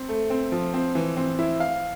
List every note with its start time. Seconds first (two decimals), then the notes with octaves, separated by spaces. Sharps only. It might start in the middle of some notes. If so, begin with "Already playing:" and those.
Already playing: C4
0.09 A3
0.30 C4
0.52 F3
0.74 C4
0.95 E3
1.17 C4
1.39 E4
1.60 F5